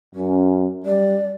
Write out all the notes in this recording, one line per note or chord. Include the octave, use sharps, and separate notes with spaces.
F#2 C#4
G3 D5